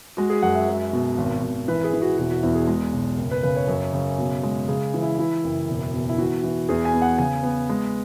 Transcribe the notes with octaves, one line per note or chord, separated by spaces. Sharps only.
G#3 F#4
G#4
F#2 F#5
E5
F#3
B2
G#1
G#1
E3 B4
G#4
E3
F#4
E1 F#4
F#4
E2 E4
G#4
G#3
B1
F#1
B4
C#3 B4
C#5
F#2
C#3
B2
G#3
C#3 G#4
E3
E4
E3 E4
F#1
E1
B2
E4
E3 F#4
E3
E2 G#4
G#5
B3
F#5
C#3 G#5
B3
G#3